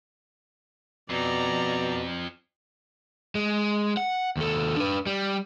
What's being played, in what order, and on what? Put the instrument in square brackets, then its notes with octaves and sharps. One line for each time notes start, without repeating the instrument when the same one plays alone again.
[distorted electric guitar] F2 [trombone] B2 [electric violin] D5 A#5
[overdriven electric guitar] G#3
F#5
D#2 A4
D4 B4
G3